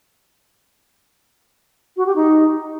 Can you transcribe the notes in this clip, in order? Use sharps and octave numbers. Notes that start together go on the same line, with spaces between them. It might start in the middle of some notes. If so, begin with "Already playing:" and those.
F#4
G4
D#4